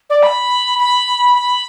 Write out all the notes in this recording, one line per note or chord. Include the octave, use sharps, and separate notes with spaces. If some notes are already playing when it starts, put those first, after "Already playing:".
D5
B5
B5
B5